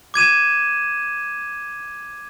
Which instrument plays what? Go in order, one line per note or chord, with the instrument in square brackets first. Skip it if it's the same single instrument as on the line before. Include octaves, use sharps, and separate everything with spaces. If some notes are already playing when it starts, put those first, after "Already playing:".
[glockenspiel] D6 G#6 D#7 E7